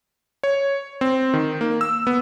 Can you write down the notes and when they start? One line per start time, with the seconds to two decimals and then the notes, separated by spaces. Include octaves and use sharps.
0.43 C#5
1.01 C4
1.34 D#3
1.61 A#3
1.81 E6
2.07 B3